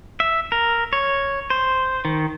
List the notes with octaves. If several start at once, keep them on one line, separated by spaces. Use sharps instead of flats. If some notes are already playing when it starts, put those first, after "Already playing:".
E5
A#4
C#5
C5
D#3